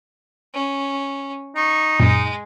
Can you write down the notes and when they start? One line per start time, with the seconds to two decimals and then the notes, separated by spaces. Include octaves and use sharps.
0.54 C#4
1.56 D#4 C#6
2.00 F#2 A#2 G#3